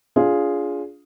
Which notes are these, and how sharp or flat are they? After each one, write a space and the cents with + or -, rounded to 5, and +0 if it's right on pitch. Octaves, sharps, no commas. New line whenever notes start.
D4 -35 F4 +0 G#4 +0